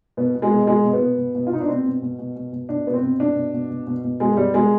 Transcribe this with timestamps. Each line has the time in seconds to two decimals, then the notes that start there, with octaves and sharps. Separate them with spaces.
0.17 B2 B3
0.34 B2
0.42 G#3
0.51 B2
0.67 B2 G#3
0.84 B2
0.93 B3
1.01 B2
1.18 B2
1.35 B2
1.47 F4
1.51 B2 D#4
1.61 D4
1.69 B2 C4
1.84 B2
2.02 B2
2.19 B2
2.36 B2
2.52 B2
2.69 B2 D4
2.85 B2 B3
2.94 C4
3.02 B2
3.19 B2 D4
3.36 B2
3.53 B2
3.70 B2
3.87 B2
4.04 B2
4.20 B2 G#3
4.37 B2 G3
4.53 B2 G#3